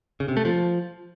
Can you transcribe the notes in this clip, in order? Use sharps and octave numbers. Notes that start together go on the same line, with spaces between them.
C#3
C3
A3
F3